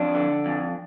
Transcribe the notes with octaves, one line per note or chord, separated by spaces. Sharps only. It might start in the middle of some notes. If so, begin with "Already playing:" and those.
Already playing: F2 D4
D3
F2